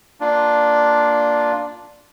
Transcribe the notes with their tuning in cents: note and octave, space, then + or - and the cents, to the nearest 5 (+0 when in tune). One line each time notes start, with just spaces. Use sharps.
A#3 +0 D4 +0 F4 +0